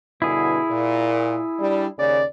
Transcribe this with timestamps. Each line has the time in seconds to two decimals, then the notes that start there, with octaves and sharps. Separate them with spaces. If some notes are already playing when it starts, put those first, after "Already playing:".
0.22 G2 B2 D3 E4 G#4
0.70 A#2
1.59 G3 D4
1.98 D#2 C#3 D5